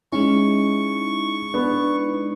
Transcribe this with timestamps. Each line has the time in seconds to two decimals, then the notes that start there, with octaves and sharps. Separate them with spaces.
0.12 G#3 C#4 D#4 E4 C#6
1.54 B3 D4